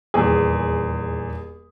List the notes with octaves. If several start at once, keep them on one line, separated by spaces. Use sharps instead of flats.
D#1 E2 G#4